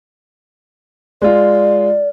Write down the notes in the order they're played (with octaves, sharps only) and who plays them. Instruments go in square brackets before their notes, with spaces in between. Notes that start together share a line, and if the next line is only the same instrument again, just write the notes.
[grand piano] G#3 F4 [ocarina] D5